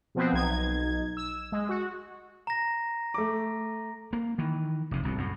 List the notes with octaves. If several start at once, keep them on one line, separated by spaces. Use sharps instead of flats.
B2 F3 B3 C4
B1 D#4 G#6
E6
G#3
F#4
A#5 A#6
A3 D6
A#3
D#3 E3
F1 C3
D1 C2 B2
F#2 A2